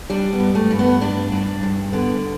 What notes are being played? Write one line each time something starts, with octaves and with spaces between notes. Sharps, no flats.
G3 D4
B3
G2
A3
G2
B3
G2 D4
G2
G2
D3 B3